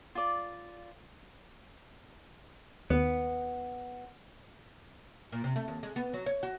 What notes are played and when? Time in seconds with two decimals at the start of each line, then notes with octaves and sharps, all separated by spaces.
0.15 F4 D5
2.90 D#2 B3
5.32 A#2
5.44 C3
5.56 A3
5.68 D#2
5.83 G#3
5.96 B3
6.13 F#3
6.26 C#5
6.43 F#4